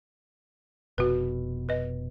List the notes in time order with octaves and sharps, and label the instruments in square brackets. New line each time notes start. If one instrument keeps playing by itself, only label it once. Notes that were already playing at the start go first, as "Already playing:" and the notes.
[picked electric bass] F1 B2 [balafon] F#4 B4
[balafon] B4 D#5